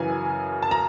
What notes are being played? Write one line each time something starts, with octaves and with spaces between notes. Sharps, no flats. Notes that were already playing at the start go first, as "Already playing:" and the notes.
Already playing: F#2 C#3 E3 G#5
A5
A#5